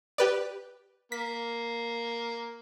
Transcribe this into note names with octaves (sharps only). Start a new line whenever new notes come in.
G4 B4 D5
A#3 B6